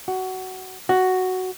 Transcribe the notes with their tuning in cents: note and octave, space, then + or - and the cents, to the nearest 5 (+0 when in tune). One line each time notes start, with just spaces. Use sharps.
F#4 +15
F#4 +5